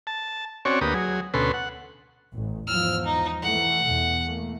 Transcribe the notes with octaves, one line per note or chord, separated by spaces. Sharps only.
A5
C4 C#4 F#4 C#5 D5
D2 A#3 G4 B4 D#6
F#3 G#4
D2 B2 C#4 A4 B4 C6
F#5
A1
E2 G#2 F3 E6 F6
D#4
E3 A3 F#5
E2 B2
A3 A#3